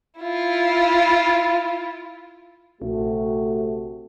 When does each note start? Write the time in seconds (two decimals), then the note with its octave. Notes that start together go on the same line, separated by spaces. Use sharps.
0.19 E4 F4
2.82 A#1 C3 A3 F#4